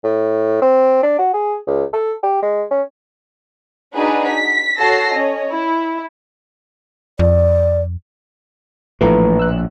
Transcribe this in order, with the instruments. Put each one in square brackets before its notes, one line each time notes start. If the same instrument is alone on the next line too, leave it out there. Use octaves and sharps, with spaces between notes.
[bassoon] A2
C4
D4
F#4
G#4
C#2
A4
G4
G#3
C#4
[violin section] D4 D#4 F#4 G#4 B4
B6
F#4 A4 C#5 A5 A#6 C7
C#4 C#5 D#5
E4
[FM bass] F2 [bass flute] D5
[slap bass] A#1 A2 [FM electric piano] E3 F3 A3 [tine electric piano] B4 A#5
[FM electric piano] E6 F#6